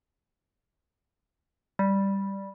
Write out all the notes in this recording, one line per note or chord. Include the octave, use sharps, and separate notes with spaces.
G3